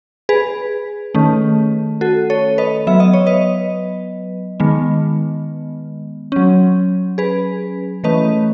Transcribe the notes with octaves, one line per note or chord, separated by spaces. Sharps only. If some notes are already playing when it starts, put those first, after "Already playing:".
G#4 B4
D#3 A3 C#4
F#4 A4
A4 C#5
B4 D#5
F#3 B3 E5
D#5
C#5
B4 D#5
D#3 G#3 B3
F#3 C#4
G#4 B4
E3 A3 C#4 B4 D#5